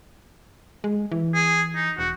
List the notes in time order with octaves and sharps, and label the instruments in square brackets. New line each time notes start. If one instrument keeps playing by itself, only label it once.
[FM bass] G#3
E3
[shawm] G#4
D#4
[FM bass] E1 [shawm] F#4